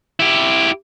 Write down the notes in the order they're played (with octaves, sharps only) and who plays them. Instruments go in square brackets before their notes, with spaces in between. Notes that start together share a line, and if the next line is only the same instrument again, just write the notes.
[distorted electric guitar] E4 G4